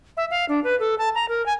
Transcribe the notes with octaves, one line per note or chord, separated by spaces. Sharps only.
E5
F5
D4
B4
A4
A5
A#5
A#4
G#5